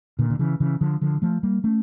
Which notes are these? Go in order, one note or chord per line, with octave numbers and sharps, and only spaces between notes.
A#2 D3
D3
C#3 E3
C#3 E3
D3 F3
D3 F3
F3 A3
G3 A#3
A3 C#4